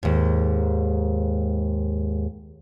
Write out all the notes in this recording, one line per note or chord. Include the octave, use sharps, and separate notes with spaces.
D#2 G#2